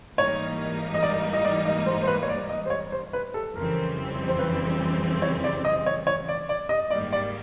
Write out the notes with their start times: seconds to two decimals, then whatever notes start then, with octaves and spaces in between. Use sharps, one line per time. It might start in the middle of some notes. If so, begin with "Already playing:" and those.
0.18 G#2 E3 G3 A#3 D#4 C#5
0.94 D#5
1.03 D5
1.33 D#5
1.44 D5
1.65 D#5
1.86 C5
2.02 C5
2.07 B4
2.23 C#5
2.29 D5
2.49 D#5
2.66 C5
2.70 C#5
2.92 C5
3.13 B4
3.34 A4
3.54 F2 C#3 E3 G3 C4 A#4
4.28 C5
4.39 B4
5.22 C#5
5.44 D5
5.65 D#5
5.86 C#5
6.07 C#5
6.28 D5
6.49 D5
6.69 D#5
6.90 G#2 D#3 G3 A#3 D5
7.12 D5